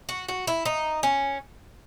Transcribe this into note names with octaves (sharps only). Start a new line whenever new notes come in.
F#4
F#4
E4
D#4
C#4